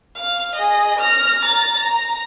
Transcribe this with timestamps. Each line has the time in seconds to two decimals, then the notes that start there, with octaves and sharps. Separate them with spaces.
0.15 F5
0.55 G#4 D#5
0.99 F6 A#6
1.43 A#5 A6
1.79 A#5